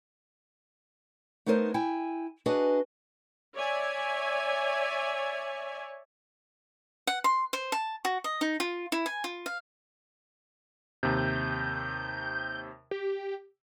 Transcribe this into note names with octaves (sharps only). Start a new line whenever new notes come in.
A3 B3 D#4 A#4 C5
E4 G5 G#5
D4 F#4 G#4 B4 D#5
C#5 D5 E5 G#5
F#5
C6
C5
A5
F#4
D#5
D#4
F4
E4
G#5
F4
F5
D#2 C3 G6
G4